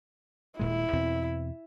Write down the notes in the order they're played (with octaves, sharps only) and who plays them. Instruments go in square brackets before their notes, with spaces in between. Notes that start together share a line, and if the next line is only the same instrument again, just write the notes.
[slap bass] D#1 A#2 G#3 [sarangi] E4
[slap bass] E2 B2 C4